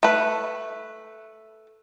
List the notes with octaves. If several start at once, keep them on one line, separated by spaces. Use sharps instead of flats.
A3 B4